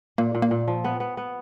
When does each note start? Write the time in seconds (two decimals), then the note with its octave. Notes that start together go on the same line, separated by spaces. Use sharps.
0.18 A#2 A#3
0.35 A#2
0.42 A#3
0.51 A#2
0.68 F3
0.84 B3
1.00 B3
1.17 B3